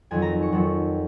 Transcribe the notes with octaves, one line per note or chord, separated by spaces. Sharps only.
F2 D#3 F#3 G#5
A#5
C#6
F2 D#3 F#3